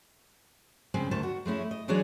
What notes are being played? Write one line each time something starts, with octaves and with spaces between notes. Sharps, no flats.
C#3 G#3 C4
D2 D#3 C5 A5
F#4
G#3 A3 C#4 E4
D#5
E3 F#3 G#3 D4 G#4 C#5